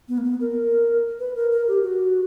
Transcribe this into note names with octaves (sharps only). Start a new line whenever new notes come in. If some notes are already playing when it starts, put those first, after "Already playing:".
B3
A#3
B3
A#4
B4
A#4
A#4
G4
F#4